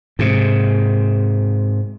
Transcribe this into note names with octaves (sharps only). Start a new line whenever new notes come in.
G#2 C3